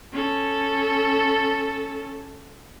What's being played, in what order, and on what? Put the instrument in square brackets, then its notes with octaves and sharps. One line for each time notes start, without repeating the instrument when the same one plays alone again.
[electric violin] C#4 A4